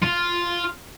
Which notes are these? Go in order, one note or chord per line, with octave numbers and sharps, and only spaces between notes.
F4